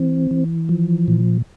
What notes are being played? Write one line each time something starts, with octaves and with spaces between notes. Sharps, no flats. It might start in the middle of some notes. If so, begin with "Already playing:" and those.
Already playing: E3 C4
E3
F3
A#2